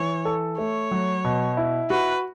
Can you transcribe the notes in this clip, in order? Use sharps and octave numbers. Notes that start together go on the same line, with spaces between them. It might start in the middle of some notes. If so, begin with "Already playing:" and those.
Already playing: E3 C#5
A4
A3 C#5
F#3
B2
E4
F#4 B4